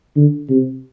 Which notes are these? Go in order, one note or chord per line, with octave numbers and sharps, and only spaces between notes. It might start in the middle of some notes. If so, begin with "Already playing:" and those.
D3
C3